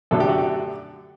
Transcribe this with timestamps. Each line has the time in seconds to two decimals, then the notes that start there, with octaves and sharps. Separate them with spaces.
0.11 F#2 D3 F#3 A3 A4
0.20 G4
0.29 F#4
0.38 G4